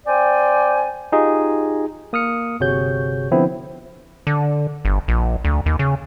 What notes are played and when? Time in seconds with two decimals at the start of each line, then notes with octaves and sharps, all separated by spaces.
0.06 C4 D5 G5 G#5
1.12 D#4 F4 G4 G#4 D#5
2.13 A#3 D#6 F6 C#7
2.60 G1 C3 F#4 G#4 C#5 G6
3.31 D3 F3 B3 C4 E4
4.27 D3
4.85 G1
5.08 A#1
5.45 D2
5.66 D#2
5.79 C#3